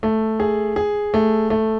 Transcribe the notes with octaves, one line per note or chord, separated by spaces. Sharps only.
A3
G#4
G#4
A3
A3